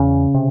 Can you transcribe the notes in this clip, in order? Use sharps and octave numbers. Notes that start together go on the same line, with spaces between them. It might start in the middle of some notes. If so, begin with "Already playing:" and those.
Already playing: E2 C#3 C#4
C3